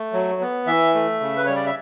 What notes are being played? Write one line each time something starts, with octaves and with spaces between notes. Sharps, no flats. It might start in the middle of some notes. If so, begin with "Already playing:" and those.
Already playing: A3
F#3
B3
E3 E5
A3
C#3
B4
G3 C#5
D5
E5